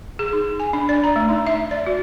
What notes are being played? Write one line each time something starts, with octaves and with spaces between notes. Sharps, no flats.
G#4
D#4
G#5
D4
D5
A#5
A3
D#4
E5
D5
F#4